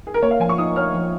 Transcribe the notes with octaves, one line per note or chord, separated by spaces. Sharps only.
G#4
A#4
A#3 C#5
F5
F3 G#5
C#6
D#4 D#6
C#5 F6
F3